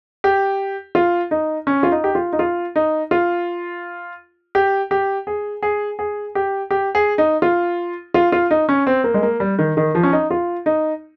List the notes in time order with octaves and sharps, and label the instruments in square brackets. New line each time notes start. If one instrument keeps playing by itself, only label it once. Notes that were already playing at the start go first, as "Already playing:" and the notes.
[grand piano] G4
F4
D#4
C#4
F4
D#4
G4
F4
D#4
F4
D#4
F4
G4
G4
G#4
G#4
G#4
G4
G4
G#4
D#4
F4
F4
F4
D#4
C#4
C4
A#3
G#3
A#3
G3
D#3
D#3
F3
C#4
D#4
F4
D#4